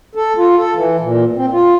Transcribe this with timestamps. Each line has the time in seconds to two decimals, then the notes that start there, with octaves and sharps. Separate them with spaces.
0.15 A4
0.37 F4
0.57 A4
0.75 E3
1.00 A#2
1.36 C4
1.51 F4